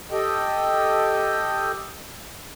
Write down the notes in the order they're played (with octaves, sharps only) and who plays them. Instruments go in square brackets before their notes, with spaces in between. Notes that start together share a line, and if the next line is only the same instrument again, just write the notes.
[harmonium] G4 A4 D#5 G5